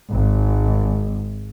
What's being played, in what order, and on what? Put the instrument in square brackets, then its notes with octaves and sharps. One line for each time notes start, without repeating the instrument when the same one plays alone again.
[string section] G#1